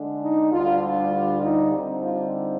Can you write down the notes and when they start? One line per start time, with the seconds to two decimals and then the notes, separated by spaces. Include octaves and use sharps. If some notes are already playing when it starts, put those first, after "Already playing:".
Already playing: D3 G#3 D4
0.22 D#4
0.52 D2 D3 G3 D4 F4
0.82 F4
1.43 D#4
1.73 D3 G3 C4 D#4
2.03 F4